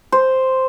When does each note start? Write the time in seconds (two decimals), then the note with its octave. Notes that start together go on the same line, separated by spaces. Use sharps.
0.12 C5